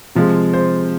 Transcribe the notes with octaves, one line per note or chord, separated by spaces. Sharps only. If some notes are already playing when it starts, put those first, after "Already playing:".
C3 F3 G#3
C5